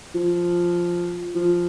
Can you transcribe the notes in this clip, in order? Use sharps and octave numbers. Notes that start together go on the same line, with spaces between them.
F3
F3